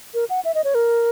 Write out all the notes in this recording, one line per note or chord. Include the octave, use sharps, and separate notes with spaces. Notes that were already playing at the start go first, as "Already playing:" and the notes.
A#4
F#5
E5
D#5
C#5
A#4